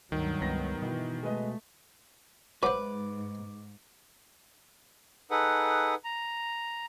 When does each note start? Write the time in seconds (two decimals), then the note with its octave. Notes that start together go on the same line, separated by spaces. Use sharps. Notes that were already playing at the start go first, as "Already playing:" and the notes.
0.12 D2 G2 D#3 F#3
0.41 C#2 B3 A#6
0.82 B2 E3
1.23 G#3 A3 B4 D#5
2.63 G#2 F#3 B4 C5 D6
5.31 D#4 G#4 A4 B4 F#5
6.04 A#5